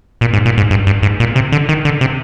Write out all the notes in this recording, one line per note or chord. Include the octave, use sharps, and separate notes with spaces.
A#2
G#2
A#2
G#2
G2
G2
G#2
A#2
C3
D3
D#3
D3
C3